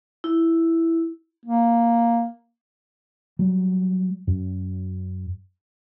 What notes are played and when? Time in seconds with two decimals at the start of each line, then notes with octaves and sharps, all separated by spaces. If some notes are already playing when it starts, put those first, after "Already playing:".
0.24 E4
1.45 A#3
3.39 F#3 G3
4.27 F#2